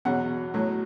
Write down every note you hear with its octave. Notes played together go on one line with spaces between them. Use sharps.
E2 B2 F#3 F#5
A2 F#3